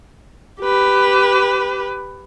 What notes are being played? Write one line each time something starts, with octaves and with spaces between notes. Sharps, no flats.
G4 B4